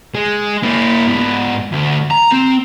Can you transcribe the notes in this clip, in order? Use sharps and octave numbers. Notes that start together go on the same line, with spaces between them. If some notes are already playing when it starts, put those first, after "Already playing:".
G#3
A#3 E4
G#2 B3
D2
A#5
C4